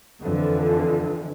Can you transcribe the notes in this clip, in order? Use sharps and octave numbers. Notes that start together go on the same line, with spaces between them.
F2 D3 E3